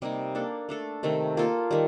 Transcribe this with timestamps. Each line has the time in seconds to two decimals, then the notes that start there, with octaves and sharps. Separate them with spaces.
0.02 C3 G3 A#3 D#4
0.35 A#3 D4 A4
0.69 A3 D4 A4
1.03 C3 D#3 A3
1.37 A#3 F4 A4
1.71 D#3 G3